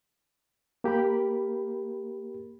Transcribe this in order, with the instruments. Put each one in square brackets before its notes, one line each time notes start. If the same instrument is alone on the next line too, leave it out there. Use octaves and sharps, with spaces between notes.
[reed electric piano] A#3 G4 A#4 B5